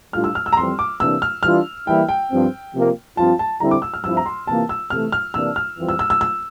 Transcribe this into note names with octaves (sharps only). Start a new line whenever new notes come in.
A2 G3 D4 F4 F6
E6
F6
E6
A#5
F2 E3 G3 C4 C6
D6
C3 E3 A#3 D4 E6
F6
E3 G3 D4 F4 F6
E3 G3 A#3 E4 G5
G5
G2 F3 C4
C3 F3 A#3 F4
G2 F3 C4 F4 A5
A5
D3 G3 C4 E4 A#5
D6
E6
F6
G2 F3 C4 E4 E6
A#5
C6
C3 E3 A#3 F4 A5
E6
C3 E3 A3 F6
F6
C3 E3 A#3 D4 E6
F6
F2 E3 G3 C4 F4
E6
E6
E6
E6